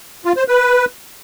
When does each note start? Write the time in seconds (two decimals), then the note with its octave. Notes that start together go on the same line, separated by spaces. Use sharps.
0.25 F4
0.37 C5
0.48 B4